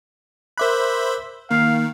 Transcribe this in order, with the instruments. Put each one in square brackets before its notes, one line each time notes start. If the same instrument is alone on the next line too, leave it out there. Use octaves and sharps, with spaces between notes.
[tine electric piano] A#4 D6 F#6 [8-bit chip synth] C5 E5 B5
[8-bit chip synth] D#3 [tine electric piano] A#3 [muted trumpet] F5